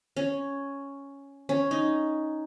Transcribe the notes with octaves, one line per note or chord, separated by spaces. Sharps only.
C#4
C#4
D#4